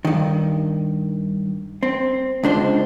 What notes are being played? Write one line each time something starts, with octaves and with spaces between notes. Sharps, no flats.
G2 D#3
C4
C#2 D4 C5